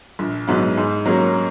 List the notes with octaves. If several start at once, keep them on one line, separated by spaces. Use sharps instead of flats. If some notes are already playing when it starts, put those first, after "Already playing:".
A#1
G#2 F#3 B3
G#2
F#3 A#3 C#4